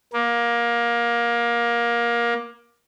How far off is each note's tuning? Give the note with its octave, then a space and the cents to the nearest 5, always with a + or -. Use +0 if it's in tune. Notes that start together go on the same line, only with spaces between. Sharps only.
A#3 +20